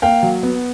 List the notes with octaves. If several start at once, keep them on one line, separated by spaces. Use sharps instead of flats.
A#3 F5 G5
F#3
B3